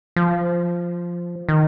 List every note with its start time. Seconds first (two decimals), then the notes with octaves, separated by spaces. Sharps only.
0.16 F3
1.49 D#3